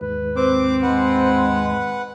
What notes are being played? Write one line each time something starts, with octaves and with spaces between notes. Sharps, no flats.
D#2 G#2 B4
C4 D6
G#3 B4 F#5